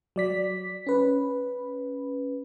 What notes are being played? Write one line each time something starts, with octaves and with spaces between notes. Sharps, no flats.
F#3 D5 B6
C#4 B4